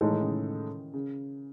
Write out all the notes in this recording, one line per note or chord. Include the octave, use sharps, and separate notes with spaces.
A2 E3 G#3 D#4 A4
D#3
C#3
D#3
C#3